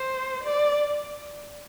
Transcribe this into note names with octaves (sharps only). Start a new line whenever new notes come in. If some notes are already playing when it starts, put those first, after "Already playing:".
Already playing: C5
D5